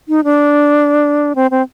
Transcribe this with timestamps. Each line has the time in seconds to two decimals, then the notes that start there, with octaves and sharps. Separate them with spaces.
0.09 D#4
0.24 D4
1.35 C4
1.51 C4